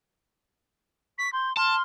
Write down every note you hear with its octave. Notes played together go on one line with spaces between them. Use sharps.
C#6 B6
C6 G6
A5 C6 F6